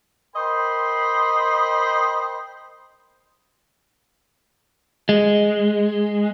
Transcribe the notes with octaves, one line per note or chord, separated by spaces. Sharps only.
A#4 C5 D#5 G5 B5 C6
G#3